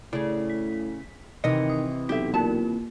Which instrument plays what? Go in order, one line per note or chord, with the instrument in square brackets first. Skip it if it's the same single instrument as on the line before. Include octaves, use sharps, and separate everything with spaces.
[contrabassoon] A2 [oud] C#3 [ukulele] G#4 D5
[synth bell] B6
[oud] C3 E3 [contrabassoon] D#3 [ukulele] D#5 [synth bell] C#7
[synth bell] D#6
[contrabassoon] B1 [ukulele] G4 E5 [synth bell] A4 B6
[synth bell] A#3 F4 A#4 [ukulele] A5